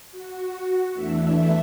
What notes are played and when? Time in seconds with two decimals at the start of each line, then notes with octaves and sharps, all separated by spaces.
0.12 F#4
0.93 E2 E3 A3 D4 E5